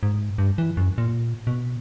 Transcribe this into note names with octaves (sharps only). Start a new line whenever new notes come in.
G#2
G2
E3
F#2
A#2
B2